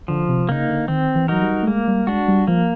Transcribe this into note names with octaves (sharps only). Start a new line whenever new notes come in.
D3 F3
C3
C#3 A#3 D#4
D3
D#3 C4
E3
F#3 D#4 F#4 A#4
G3
A3
G#3 A#3
G3
G#3 D4 F#4
G3
F3 A#3